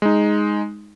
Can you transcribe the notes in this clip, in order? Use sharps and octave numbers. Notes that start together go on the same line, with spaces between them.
G#3 D#4